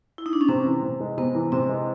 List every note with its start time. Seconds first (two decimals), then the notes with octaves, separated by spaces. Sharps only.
0.18 E4
0.26 D#4
0.33 D4
0.41 C#4
0.48 C3 C4
0.66 E3
0.83 C3
1.00 G#3
1.17 C3 B3
1.35 E3
1.52 C3 C4
1.69 G#3